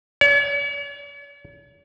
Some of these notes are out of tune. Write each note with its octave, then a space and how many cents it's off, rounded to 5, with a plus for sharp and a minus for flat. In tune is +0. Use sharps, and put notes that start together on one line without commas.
C#5 +45